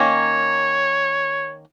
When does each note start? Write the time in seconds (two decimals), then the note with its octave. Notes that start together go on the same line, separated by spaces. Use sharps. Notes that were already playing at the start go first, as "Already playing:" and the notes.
Already playing: D#3 A#3 C#4 C#5